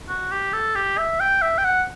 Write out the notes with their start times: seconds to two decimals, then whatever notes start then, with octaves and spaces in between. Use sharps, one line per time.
0.09 F#4
0.31 G4
0.53 A4
0.75 G4
0.98 E5
1.20 G5
1.42 E5
1.58 G5
1.65 F#5